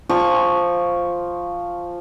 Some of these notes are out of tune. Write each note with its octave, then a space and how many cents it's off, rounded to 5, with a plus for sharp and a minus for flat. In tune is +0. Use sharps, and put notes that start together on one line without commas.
F3 +0 G#5 -45 C#6 +0